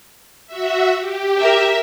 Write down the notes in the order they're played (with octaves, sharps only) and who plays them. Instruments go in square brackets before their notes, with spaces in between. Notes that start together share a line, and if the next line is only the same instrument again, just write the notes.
[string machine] F#4 E5
G4
[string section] A#4 E5